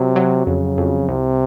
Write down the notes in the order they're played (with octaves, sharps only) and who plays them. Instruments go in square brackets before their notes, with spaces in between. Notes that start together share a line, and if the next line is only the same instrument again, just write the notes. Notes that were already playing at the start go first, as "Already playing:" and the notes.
Already playing: [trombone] C3 [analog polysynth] F#3
[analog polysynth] F#3
[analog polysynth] F2 [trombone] C#3
[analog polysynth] F2
[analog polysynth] C2 [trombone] C3